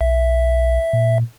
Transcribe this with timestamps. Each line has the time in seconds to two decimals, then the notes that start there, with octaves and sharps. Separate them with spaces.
0.01 B1 E5
0.93 A#2